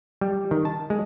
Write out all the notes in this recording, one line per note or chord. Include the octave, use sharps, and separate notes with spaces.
G3
D#3
A5
G#3